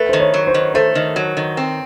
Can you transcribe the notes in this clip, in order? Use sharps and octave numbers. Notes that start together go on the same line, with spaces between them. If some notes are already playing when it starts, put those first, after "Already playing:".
Already playing: A3 B4
D#3 C5
C#5
F#3
C5
D#3
A3 C5
D#3
F#3
D#3
C4